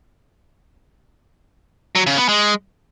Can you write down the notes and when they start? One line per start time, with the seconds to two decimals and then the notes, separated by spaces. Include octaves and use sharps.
1.95 F#3
2.07 C#3
2.18 B3
2.29 G#3